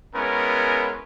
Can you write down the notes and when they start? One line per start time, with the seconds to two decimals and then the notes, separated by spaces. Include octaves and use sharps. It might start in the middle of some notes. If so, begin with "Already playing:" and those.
0.15 G#3 B3 C#4 E4 A#4